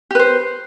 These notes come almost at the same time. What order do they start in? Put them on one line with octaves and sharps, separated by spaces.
G4 B4 C5